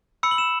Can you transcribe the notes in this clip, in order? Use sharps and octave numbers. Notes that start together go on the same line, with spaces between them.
B5 E6 C#7
F#7
E7